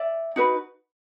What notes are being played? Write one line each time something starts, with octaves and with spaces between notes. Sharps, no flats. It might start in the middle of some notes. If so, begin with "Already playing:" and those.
Already playing: D5 E5
D#4 F#4 B4